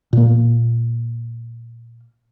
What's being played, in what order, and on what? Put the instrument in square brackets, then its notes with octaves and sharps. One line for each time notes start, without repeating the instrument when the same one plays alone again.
[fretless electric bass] A#2 A#3